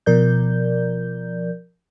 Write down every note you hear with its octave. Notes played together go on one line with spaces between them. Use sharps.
B2 F3 A#4 D5 G6